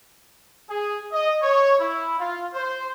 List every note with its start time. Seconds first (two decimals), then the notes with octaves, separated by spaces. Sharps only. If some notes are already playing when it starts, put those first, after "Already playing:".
0.68 G#4
1.12 D#5
1.42 C#5
1.79 E4
2.18 F4
2.54 C5